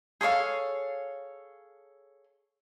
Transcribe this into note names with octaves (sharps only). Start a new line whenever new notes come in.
G#4 A4 C#5 F5